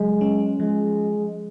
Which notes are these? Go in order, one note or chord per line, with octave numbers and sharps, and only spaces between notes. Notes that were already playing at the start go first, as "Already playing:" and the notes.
Already playing: C#3 F#3 G#3
C#4
F3 G#3